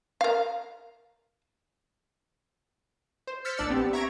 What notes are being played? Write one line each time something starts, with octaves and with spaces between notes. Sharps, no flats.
A#4 F5
C5
E6 F6 G6 A6 B6 C#7
A#1 D4 D5 E6 A6 C#7
B3 C4 G4
E5 A#5 C#6 G#6 A#6 D7